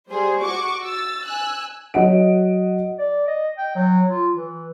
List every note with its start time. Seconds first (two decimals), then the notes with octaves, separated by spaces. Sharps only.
0.10 G3 G#4 C5
0.42 F#4 C#6 D6
0.84 E6 A6
1.27 G#5 E6 F#6
1.94 F#3 C#5 D#5 F#5 D7
2.98 D5
3.27 D#5
3.58 G5
3.75 F#3
4.11 F4
4.35 E3